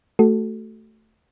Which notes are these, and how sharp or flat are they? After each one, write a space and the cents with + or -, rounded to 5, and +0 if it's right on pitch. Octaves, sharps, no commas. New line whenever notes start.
A3 +0 F#4 +20 A4 +0